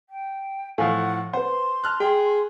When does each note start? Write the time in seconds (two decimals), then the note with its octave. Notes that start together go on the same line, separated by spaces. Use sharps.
0.10 G5
0.78 A2 F3 A4 F5 F#5 G#5
1.33 B4 C5 F#5 C6
1.84 A5 F6 F#6
2.00 G#4 G5